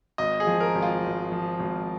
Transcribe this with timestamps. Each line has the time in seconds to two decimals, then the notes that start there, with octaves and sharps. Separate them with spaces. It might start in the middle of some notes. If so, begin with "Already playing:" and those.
0.18 G#1 D#5
0.40 G#4
0.47 F3
0.60 A#4
0.75 G#1
0.82 F4
1.04 G#1
1.32 F3
1.60 G#1